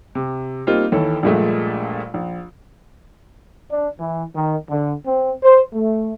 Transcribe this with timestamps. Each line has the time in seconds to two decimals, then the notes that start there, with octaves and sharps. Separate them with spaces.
0.15 C3
0.67 G3 A#3 C4 D#4 F4
0.92 D#2 E3 A4 C#5
1.23 A#1 G2 A#2 G#3 A3
2.14 A#1
3.70 D4
3.99 E3
4.35 D#3
4.70 D3
5.06 C4
5.43 C5
5.73 A3